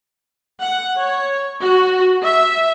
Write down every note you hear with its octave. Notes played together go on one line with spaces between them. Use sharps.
F#5
C#5
F#4
E5